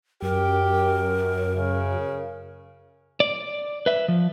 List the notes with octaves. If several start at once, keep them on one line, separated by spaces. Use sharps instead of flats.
F#2 G4 A#4
C#3
D5
B4 E5
F3